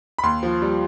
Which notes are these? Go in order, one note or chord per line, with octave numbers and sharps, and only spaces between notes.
B5
D#2 C6
F3
G3